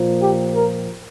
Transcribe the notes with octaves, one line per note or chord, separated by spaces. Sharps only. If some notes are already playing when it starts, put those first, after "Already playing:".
Already playing: A#2 F3 A#3
G4
A#4